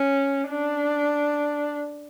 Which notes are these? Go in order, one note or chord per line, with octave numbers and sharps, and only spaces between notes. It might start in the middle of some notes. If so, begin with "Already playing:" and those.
Already playing: C#4
D4